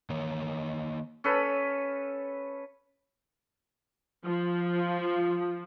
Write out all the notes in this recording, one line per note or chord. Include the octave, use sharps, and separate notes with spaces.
D#3 A#3 C#5
C#4 A4 B4
F3